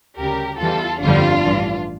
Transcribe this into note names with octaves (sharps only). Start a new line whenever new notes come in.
D2 C#3 G3 G4 A#4
E2 E3 G3 F4 A4
G1 F2 D3 G3 D4 F4
A1 G2 E3